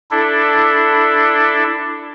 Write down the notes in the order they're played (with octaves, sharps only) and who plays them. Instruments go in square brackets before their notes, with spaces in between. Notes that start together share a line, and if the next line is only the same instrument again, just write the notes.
[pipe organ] D4 E4 A4